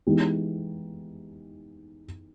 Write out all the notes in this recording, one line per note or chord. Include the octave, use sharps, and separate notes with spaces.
E3 G#3 B3 D#4 G4